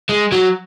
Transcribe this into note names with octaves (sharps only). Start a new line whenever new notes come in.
G#3
F#3